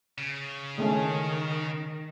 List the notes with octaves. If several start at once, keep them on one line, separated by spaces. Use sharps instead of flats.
C#3
D#3 G#3 A3 C#4